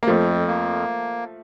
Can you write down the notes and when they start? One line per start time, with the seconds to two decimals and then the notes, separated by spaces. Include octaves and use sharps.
0.03 A#3
0.07 F2 F3 A3
0.48 A#3